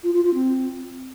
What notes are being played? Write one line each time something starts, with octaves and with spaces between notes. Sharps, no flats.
F4
F4
F4
C4